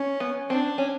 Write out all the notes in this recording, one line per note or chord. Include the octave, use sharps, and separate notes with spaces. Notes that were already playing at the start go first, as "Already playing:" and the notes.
Already playing: C#4
B3
C4 D4
C#4